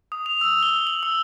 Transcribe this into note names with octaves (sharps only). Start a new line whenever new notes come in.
D#6
F7
E6
G7
F#7
E6